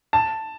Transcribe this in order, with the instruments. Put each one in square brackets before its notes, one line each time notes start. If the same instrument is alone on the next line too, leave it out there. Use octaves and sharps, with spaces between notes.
[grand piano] A5